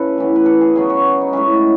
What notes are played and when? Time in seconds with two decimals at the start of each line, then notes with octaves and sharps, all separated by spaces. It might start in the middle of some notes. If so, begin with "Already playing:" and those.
Already playing: C#3 E4 A4 B4
0.18 A2 E3 B3
0.36 B4
0.46 A4
0.61 G#4
0.76 C#3 F#3 B3 G#4
0.90 F#4
1.21 D#4
1.33 A2 G#3 C#4 E4